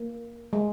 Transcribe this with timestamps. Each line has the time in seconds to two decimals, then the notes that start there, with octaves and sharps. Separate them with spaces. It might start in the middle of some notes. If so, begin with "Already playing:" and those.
Already playing: A#3
0.53 G#3